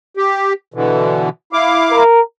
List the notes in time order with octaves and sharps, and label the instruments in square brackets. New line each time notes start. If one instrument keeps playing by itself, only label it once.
[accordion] G4
B2 D3 E3
E4 F5 D6
[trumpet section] A#4